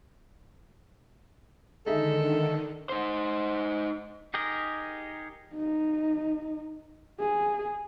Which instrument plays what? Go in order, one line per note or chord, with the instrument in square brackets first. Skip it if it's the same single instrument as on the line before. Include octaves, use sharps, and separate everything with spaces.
[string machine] D3 D#3 [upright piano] G#3 D#4 E5 [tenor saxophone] A4
[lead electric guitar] D#4 C5
[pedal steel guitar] D#4 G4 G#4 A#4 D#5
[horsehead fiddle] D#4
G#4